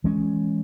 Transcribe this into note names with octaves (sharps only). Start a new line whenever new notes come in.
E3 G#3 C#4